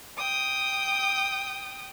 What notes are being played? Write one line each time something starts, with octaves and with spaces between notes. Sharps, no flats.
G5 D#6